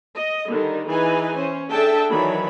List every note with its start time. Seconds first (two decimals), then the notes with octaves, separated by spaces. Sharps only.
0.16 D#5
0.49 D3 D#3 G3 D#4
0.89 E3 D#4 G#4 B4 G#5
1.37 C#4 C5
1.71 D4 G#4 A4 E5 G5 A5
2.11 D#3 E3 F#3 D4 C#5 B5